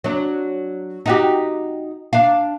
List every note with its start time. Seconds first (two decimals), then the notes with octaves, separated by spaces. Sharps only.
0.04 F#3 D4
1.06 D#4 F#4 G4
2.13 D4 F5